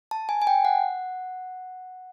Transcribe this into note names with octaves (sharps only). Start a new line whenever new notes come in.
A5
G#5
G#5
G5
F#5